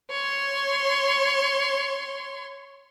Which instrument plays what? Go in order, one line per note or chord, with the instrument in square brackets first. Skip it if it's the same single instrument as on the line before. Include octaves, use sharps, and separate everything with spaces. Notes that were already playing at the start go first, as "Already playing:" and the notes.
[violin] C#5 C6